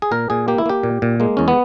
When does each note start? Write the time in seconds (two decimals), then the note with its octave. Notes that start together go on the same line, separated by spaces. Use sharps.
0.02 G#4
0.11 A#2 A#4
0.30 A#2 G#4
0.48 A#3 G4
0.58 E4
0.66 A#3 G4
0.83 A#2
1.02 A#2
1.20 G#3 A#3
1.37 E2 C#4
1.48 B3